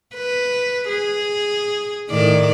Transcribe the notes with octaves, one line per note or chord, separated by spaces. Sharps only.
B4
G#4
A2 D#3 D5